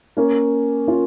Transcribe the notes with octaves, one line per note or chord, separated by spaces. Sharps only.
A#3 C#4
C#4 F4